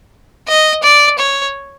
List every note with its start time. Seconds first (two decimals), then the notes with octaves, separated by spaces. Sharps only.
0.48 D#5
0.83 D5
1.19 C#5